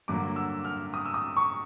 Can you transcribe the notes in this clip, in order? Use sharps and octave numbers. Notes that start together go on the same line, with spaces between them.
G2 D3 F#3 A#3 D6
E6
F6
D#6
E6
D#6
C#6